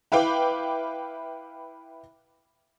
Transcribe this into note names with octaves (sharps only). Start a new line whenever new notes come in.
E4 B4 F5 G5 D6